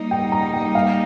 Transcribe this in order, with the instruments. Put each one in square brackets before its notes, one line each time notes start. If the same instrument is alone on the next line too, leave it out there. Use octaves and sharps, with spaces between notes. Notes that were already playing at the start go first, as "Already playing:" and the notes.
Already playing: [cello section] G3 A#3 D#4
[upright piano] G5
A#5
G5
F5